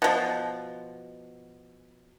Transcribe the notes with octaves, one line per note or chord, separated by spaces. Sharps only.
B2 F3